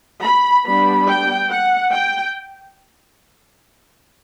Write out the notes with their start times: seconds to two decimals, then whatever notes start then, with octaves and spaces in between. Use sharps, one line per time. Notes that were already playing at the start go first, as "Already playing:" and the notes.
0.23 B5
0.66 G3 B3 D4 B5
1.08 G5
1.50 F#5
1.93 G5